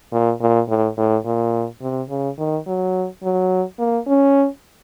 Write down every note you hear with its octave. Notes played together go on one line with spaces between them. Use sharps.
A#2
A#2
A2
A2
A#2
C3
C#3
D#3
F#3
F#3
A#3
C#4